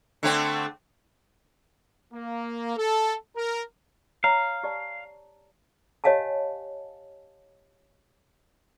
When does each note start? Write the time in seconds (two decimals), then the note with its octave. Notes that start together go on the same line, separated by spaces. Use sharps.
0.23 D3 A3 C4
2.13 A#3
2.77 A4
3.36 A#4
4.24 C#5 F5 A#5
4.63 G4 D5 A5
6.04 G4 C#5 D#5 F5 G#5 A5